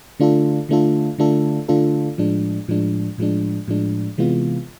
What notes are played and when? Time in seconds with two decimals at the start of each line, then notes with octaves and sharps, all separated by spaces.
0.20 D3 A3 D4 F4 A4
0.69 D3 A3 D4 F4 A4
1.18 D3 A3 D4 F4 A4
1.69 D3 A3 D4 F4 A4
2.18 A2 F3 G#3 D4
2.68 A2 F3 G#3 D4
3.18 A2 F3 G#3 D4
3.68 A2 F3 G#3 D4
4.18 C3 E3 G#3 B3 F4